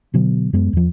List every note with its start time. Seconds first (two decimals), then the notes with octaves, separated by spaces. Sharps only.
0.14 B2 D3 F#3 B3
0.53 F#2 G#3 B3
0.73 E2 F3